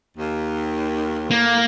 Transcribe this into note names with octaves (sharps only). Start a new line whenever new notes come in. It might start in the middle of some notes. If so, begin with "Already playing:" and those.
D#2
A2 A#3